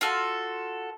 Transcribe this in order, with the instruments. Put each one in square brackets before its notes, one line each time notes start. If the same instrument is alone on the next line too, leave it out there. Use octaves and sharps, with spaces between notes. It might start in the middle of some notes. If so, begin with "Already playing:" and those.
[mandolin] F4 F#4 A4